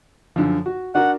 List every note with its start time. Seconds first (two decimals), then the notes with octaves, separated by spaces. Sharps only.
0.36 F#2 D3 F3
0.66 F#4
0.95 D4 F#4 A#4 F#5